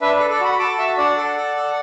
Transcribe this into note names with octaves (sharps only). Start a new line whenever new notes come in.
D4 B4 E5
A4 B4
A4 D5
F#4 F#5 B5
B5
A4 A5 D6
F#4 E5 A5
D4 D5 F#5
A4
A4
A4